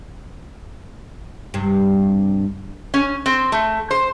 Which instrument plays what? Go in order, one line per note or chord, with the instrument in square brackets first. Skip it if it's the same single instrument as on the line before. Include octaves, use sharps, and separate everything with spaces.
[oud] G2 C3
[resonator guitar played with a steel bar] C#4
C4
A3
C5